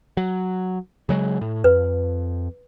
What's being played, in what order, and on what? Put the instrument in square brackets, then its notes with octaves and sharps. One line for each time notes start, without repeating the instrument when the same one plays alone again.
[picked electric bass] F#3
C#3 F#3 G#3
A2
[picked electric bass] F2 [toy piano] B4